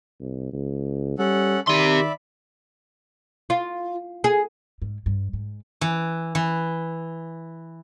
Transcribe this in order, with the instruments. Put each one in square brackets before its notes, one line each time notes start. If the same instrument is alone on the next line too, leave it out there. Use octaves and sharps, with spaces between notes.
[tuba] C2
C#2
[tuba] G3 [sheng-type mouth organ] C#4 A4 F#5
[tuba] D#3 [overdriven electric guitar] G4 C6 [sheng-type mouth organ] D5 E5 B5
[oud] F4
G#4
[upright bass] G#2
G2
G#2
[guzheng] E3
E3